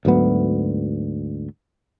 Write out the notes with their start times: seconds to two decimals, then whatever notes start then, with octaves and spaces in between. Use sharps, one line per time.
0.05 D2 G#2 F#3 B3